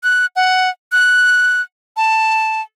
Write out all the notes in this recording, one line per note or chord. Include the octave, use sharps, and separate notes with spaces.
F#6
F#5
F#6
A5